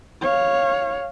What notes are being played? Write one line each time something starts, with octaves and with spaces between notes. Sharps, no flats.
C#5 F5